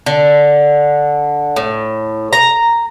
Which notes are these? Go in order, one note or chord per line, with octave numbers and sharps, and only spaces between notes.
D3
A2
A#5